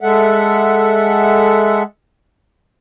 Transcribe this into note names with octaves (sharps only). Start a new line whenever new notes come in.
G#3 A4 E5 F#5